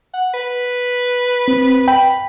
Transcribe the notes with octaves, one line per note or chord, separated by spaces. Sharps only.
F#5
B4
C4
G5 B5